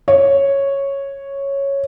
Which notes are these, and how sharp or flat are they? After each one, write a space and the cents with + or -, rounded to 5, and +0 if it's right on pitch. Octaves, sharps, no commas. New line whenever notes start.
C#5 -5